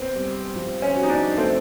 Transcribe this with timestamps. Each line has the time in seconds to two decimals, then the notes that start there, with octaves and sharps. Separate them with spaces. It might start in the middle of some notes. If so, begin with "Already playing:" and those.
Already playing: B3 C4
0.15 G3
0.56 F3
0.82 C#4
0.96 F#4
1.03 D#4
1.10 D4
1.37 A3 C4